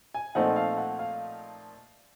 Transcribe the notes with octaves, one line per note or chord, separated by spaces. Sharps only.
G#5
A#2 F3 A3 C4 D#4 F#5
F5
F#5
F5